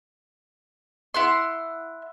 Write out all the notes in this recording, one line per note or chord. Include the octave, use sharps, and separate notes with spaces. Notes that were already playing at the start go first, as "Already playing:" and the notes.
E4 F#5 C6